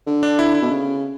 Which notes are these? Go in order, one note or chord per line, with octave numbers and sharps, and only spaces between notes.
D3
D4
E4
E4
B2
C#3